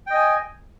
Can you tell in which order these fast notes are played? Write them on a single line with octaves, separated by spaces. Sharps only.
G5 D#5 G#5